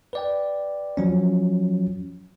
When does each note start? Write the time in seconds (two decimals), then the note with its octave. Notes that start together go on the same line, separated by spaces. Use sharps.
0.13 B4 D5 G5
0.97 F3 F#3 C#4